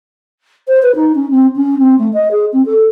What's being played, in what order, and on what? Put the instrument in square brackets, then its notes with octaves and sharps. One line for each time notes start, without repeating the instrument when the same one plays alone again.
[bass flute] C5
B4
D#4
C#4
C4
C#4
C4
A3
D#5
G#4
C4
A4